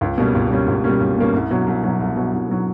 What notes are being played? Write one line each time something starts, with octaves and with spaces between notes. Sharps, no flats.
C#2
B2 G3 A#3 C#4
C#2
B2 G3 A#3 C#4
C#2
B2 G3 A#3 C#4
C#2
B2 G3 A#3 C#4
C2
B2 F#3
C2
B2 F#3
C2
B2 F#3
C2
B2 F#3